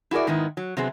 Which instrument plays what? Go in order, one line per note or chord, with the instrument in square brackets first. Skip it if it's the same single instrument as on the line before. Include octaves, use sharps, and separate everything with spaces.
[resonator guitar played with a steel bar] E4 F#4 G#4 A#4 D5
G#2 D#3 B3 D#4 E4
F#3
C3 F#3 B3 C4 G#4